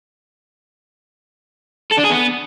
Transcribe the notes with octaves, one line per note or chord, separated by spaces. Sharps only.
A4
D4
G#4
B3